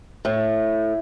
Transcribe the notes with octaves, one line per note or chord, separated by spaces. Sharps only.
A2